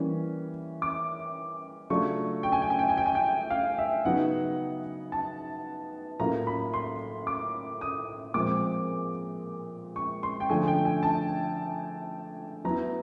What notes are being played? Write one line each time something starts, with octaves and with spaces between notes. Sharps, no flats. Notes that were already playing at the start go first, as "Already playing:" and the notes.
Already playing: E3 G3 A#3 C#4
D6
C#3 F#3 A3 D4 F4 C#6
G5
G#5
G5
G#5
G5
G#5
G5
G#5
G5
F5
E5
C#3 F#3 B3 D#4 F#5
A5
A2 F#3 A#3 C#4 F4 A#5
B5
C6
D6
D#6
A#2 F3 G#3 C4 D6
C#6
C6
G5
D3 F3 A3 D4 G#5
G5
G#5
A5
F#3 B3 E4 A#5